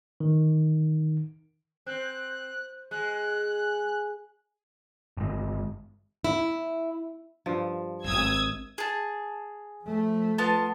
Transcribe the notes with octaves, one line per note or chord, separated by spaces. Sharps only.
D#3
C4 F#6
G#3 F#6
G1 G#3
E4
G2 F3
D#1 G#1 D#6 E6 G#6
G#4 A5
F3 A3
B3 F4 A5